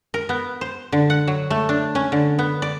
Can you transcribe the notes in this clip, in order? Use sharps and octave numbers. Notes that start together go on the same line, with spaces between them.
A#4
B3
C5
D3
F#5
F#3
A3
D4
C#4
D3
B3
D5